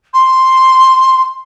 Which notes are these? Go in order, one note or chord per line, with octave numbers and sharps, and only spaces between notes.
C6